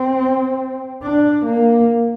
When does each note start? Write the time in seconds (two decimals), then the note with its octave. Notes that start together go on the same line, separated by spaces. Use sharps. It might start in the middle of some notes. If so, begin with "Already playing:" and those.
Already playing: C4
1.03 D4
1.45 A#3